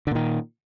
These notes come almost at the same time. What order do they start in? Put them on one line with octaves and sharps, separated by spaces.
D3 A#2 D#3